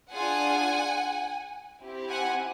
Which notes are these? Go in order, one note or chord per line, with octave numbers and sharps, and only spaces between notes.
D4 F4 G#4 F#5 G#5
C4 E4 G4
F#5 G#5